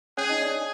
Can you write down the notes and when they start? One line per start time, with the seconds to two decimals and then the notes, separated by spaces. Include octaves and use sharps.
0.17 C#4 G#4 C#5
0.29 D#4 D#5
0.42 D4 D5